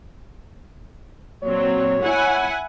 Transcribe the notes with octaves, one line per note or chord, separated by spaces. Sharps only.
A#2 F#3 C4 C#5
E4 F#5 G#5